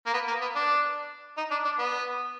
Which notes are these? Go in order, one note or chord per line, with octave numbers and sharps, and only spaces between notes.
A#3
B3
A#3
B3
D4
D#4
D4
D4
B3